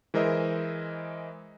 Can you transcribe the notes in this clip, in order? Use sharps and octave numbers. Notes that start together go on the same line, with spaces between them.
E3 G#3 A#4 C5 D#5 E5